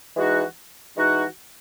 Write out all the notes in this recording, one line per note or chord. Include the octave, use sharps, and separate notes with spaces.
E3 G#3 D#4 F#4
E3 G#3 D#4 F#4